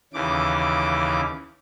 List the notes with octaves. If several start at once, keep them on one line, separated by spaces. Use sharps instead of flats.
D#2 C#3 E3 D6